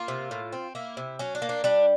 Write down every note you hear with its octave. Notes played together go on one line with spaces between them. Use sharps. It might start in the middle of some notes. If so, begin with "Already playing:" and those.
Already playing: A#3 F4
C3
A2
C4
A#3 E4
C3
F#3 C#4
D4
A#3
D4
G3 D4